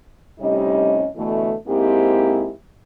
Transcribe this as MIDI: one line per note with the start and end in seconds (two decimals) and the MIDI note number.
0.40 1.07 45
0.40 1.07 48
0.40 1.07 55
0.40 1.07 61
0.40 1.07 63
0.40 1.07 75
1.16 1.53 47
1.16 1.53 50
1.16 1.53 52
1.16 1.53 57
1.67 2.51 44
1.67 2.51 58
1.67 2.51 60
1.67 2.51 64
1.67 2.51 67